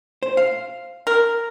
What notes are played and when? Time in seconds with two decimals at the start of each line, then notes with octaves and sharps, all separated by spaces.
0.23 C5
0.37 F5
1.07 A#4